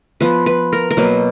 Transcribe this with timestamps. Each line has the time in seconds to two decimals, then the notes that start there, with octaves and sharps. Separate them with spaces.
0.21 F3 B3 B4
0.46 B4
0.73 A#4
0.91 A#4
0.97 B2 F#3 A#3 B4